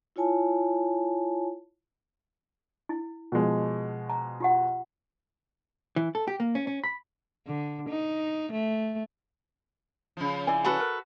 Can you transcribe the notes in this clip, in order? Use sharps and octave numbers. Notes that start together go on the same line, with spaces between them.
E4 F4 C#5 G#5 A5
E4
B2 F3 G#3
A#5
F4 G4 F#5
E3
A4
G4
A#3
C#4
C#4
B5
D3
D#4
A3
C#3 F3
E4 D5 G#5
F#4 A4 B4
A#4